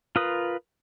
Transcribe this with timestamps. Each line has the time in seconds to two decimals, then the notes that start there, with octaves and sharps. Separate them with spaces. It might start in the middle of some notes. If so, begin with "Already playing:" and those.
0.16 F4 A#4 B4 D#6